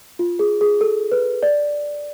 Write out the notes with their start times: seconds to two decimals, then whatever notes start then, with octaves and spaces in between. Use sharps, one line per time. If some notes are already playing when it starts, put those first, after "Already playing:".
0.19 F4
0.39 G#4
0.61 G#4
0.81 A4
1.11 B4
1.43 D5